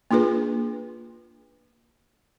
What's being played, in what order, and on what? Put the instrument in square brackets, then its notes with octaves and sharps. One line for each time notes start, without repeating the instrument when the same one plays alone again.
[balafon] A#3 D4 F4 G#4 B4